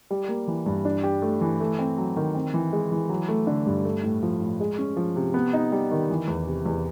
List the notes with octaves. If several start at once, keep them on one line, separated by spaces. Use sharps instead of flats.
G3
A#3
E3
G2
D4
G4
A3
E3
A3
C4
F#3
D#3
C4
E3
G#3
E3
F#3
A3
D3
G2
A3
A2
F3
A2
G#3
C#4
F3
C3
B3
D#4
G3
D#3
E3
E2
C3
E2